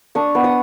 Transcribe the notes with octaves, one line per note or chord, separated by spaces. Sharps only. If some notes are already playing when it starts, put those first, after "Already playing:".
D4 C#6 D#6
B3
C#6 D#6